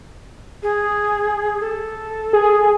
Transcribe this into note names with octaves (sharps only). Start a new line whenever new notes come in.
G#4
A4
G#4